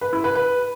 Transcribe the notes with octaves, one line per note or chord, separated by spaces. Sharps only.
B4
E4
B4
B4